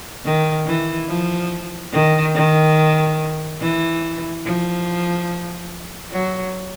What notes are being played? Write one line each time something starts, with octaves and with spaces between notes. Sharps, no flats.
D#3
E3
F3
D#3
D#3
E3
F3
F#3